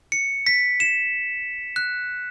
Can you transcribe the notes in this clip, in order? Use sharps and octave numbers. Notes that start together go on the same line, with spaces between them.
C#7
B6
E7
F#6